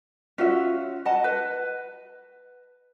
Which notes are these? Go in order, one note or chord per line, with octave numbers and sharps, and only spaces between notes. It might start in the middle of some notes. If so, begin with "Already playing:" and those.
C#4 F4 F#4 E5
D#5 F#5 A5
B4